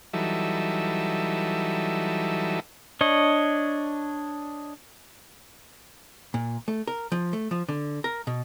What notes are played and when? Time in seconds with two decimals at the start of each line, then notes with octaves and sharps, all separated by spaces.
0.13 E3 F#3 G3 D#4 A4 E5
3.01 D4 C#5 D#5
6.34 A#2
6.68 A3
6.88 A#4
7.12 F3
7.33 A3
7.51 F3
7.69 D3
8.04 A#4
8.27 B2